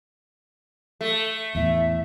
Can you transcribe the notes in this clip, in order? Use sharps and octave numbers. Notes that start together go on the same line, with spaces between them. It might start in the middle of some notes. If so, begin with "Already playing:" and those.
A3
E2 A2 E5